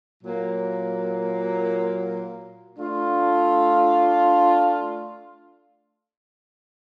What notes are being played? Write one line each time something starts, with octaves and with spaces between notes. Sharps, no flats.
A#2 F#3 A#3
A3 D4 F4